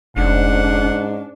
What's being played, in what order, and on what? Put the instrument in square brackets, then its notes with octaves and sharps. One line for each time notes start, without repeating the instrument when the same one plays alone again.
[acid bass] F1 [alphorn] G#2 [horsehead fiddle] C#4 D4 [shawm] F#5